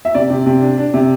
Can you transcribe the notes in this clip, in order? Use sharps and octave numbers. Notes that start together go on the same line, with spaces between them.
E5
C3 D5
C3
C3
D4
D4
C3